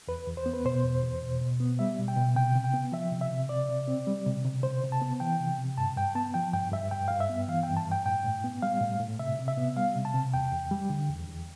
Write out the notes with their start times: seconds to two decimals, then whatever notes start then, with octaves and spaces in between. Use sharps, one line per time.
0.08 E2 B4
0.27 E2
0.37 C5
0.46 B3
0.53 B4
0.65 B2 C5
0.84 E2
1.02 E2
1.22 B2
1.41 B2
1.60 B3
1.79 G3 E5
1.99 B2
2.08 G5
2.16 B2
2.35 C3 G5
2.55 C3
2.64 G5
2.74 B3
2.92 F3 E5
3.12 C3
3.21 E5
3.31 C3
3.49 C3 D5
3.69 C3
3.88 C4
4.07 G3
4.26 C3
4.45 C3
4.63 C3 C5
4.83 C3
4.92 A5
5.02 B3
5.20 E3 G5
5.40 C3
5.58 C3
5.77 G2 A5
5.96 G2 G5
6.15 B3 A5
6.34 F3 G5
6.53 G2 G5
6.72 G2 E5
6.91 G2 G5
7.08 G2 F5
7.20 E5
7.30 B3
7.48 E3 F5
7.63 G2 G5
7.77 A5
7.86 G2
7.92 G5
8.05 A2 G5
8.24 A2
8.44 B3
8.63 G3 F5
8.81 A2
9.00 A2
9.19 C3 E5
9.39 C3
9.48 E5
9.57 B3
9.76 G3 F5
9.96 C3
10.05 A5
10.14 C3
10.34 E2 G5
10.52 E2
10.71 G3
10.90 D3
11.09 E2
11.28 E2